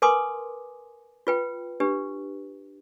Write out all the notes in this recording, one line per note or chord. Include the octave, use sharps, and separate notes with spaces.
A#4 B4 G#5 C6 D6 D#6
F4 B4 G5
D4 G4 B4